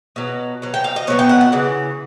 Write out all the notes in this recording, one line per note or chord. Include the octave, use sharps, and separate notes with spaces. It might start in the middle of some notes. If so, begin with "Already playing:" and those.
B2 F#3
B2 F#3
G5
F5
D#5
B2 F#3 B3 C#5
G5
F#5
F#5
C#3 E3